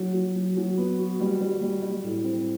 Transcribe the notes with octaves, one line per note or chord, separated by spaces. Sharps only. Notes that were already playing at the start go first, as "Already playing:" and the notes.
Already playing: F#3
F#3
F#3
F#3
B3
F#4
G3
G3
G3
G3
A2
C4